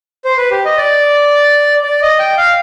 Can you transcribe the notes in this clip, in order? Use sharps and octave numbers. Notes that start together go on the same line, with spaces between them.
C5
B4
G4
D#5
D5
D5
D#5
G5
F5